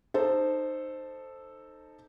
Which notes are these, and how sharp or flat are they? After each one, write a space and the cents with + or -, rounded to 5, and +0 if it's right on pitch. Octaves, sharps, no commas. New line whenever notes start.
D#4 -20 A4 +0 C5 +0